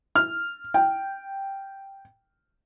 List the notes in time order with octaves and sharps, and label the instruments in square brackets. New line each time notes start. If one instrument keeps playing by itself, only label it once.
[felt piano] F6
G5